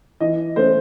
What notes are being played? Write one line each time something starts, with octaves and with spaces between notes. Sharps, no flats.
E3 D#5
A3 C#4 C5